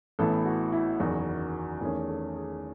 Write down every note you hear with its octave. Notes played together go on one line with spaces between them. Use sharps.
A1 A2 E3 B3 A4
F#4
E4
F#1 E2 D#3 F#3 F#4
E2 D#3 A3 C#4 G#4
A4
G#4